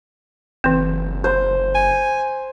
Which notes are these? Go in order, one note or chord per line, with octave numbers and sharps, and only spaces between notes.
F#1 E3 C4
C5
G#5